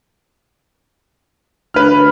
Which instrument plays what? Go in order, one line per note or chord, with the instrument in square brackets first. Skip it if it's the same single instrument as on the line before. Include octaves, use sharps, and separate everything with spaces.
[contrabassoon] D2 [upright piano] B4 F6